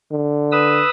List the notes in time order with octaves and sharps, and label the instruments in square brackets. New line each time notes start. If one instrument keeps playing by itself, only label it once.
[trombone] D3
[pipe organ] B4 D#6 E6